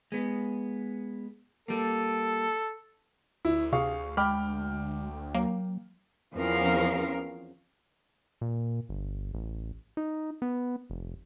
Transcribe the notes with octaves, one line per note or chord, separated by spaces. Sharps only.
G#3 B3
G3 A#3 A4
D2 E4
C3 G#4 F5 C#6
G#3 G5 B5 D6 F6
F#3 A#3
E2 F3 C4 C#4 A#4 F5
A#2
G1
A1
D#4
B3
F1